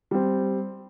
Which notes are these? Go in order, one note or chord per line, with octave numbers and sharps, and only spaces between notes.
G3 C4